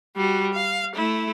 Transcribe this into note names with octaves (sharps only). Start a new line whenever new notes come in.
G3 F#4
F5
A3 E4